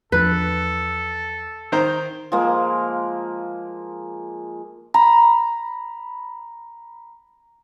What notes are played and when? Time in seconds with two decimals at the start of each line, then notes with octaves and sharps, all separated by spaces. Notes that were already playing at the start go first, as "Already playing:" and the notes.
0.12 E2 F3 D4 A4 B4
1.72 D#3 C5 A#5
2.32 F3 G#3 A#3
4.94 A#5 B5